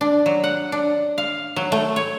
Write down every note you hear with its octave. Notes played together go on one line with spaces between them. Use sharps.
D4
F#3
F#5
D4
F5
F#3
A3
C#5